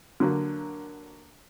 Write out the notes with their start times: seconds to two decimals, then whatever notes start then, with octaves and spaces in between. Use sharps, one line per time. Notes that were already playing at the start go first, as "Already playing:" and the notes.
0.20 D3 F#3 A#3